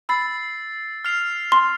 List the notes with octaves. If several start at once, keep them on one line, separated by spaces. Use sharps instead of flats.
B5 E6 A6 C7
F6 C7 F7
C6